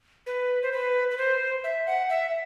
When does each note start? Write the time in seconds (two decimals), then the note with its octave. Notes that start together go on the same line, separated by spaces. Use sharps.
0.26 B4
0.62 C5
0.72 B4
1.11 B4
1.18 C5
1.64 E5
1.87 F#5
2.10 E5